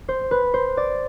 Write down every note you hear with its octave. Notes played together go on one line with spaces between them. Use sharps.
C5
B4
C5
D5